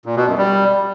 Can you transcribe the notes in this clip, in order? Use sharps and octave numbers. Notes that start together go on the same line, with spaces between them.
A#2
B2
F#2
G3